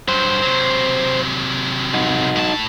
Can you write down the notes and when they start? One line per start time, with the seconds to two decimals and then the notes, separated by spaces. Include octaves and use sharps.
0.08 G2 F#3 C5
0.42 C3 F#3
1.94 D#4 F#4
2.36 A2 A5